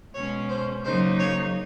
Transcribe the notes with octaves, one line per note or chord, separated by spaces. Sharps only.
B2 G#3 C#4 C#5
C5
C#3 F#3 A#3 D#4 C5
C#5